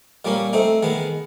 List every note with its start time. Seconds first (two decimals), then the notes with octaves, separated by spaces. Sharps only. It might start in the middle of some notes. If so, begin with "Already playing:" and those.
0.25 A#2 G3 A#3 C#4
0.53 A3 C4 D#4
0.83 D#3 G#3 B3